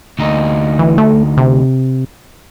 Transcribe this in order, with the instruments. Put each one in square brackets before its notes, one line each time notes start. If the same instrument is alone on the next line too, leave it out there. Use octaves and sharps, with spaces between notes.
[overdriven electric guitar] D2 D#4
[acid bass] E3
A3
C3